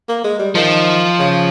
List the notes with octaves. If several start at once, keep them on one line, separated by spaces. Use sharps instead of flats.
A#3
G#3
G3
D#3 F3
C#3